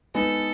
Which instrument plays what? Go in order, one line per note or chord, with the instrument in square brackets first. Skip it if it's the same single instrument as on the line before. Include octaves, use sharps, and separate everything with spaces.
[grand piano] G#3 B3 D#4 [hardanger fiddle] A4